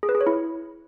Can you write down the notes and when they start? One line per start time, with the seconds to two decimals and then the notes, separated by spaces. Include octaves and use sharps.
0.03 G#4
0.09 B4
0.15 G#4
0.21 C#5
0.27 E4